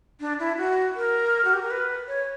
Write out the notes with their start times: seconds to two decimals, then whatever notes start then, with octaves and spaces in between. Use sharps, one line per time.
0.20 D4
0.39 E4
0.58 F#4
0.96 A#4
1.45 F#4
1.53 G4
1.62 A#4
1.71 B4
2.08 C#5